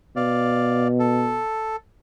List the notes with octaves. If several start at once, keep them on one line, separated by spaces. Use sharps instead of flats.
B2 D5 F5
A4